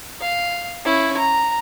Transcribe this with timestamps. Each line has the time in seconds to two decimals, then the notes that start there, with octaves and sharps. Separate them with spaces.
0.21 F5
0.85 C#4 E4
1.17 A#5